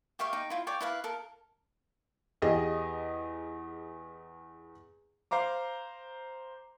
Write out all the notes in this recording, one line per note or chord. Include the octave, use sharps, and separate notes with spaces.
G4 E5 F5 C#6
D#4 G5
E4 F4
C#5 D5 G5
E4 B4 F5
A4 A#4
E2 G4 G#4 D#5
C5 F5 A#5 D6